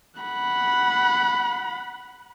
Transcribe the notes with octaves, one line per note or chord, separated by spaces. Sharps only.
F#5 B5